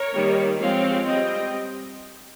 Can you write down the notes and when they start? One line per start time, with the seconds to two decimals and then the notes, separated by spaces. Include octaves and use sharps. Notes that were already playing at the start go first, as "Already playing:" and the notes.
Already playing: A#4 C#5
0.13 D#3 G3 A#3
0.60 F3 G#3 C4 C#5 F5
1.07 G3 C4 D#5 G5